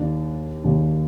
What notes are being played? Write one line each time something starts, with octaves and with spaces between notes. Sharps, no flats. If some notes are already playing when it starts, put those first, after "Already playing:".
Already playing: D#2 D#3 A#3 D4
D#2 D#3 A#3 D4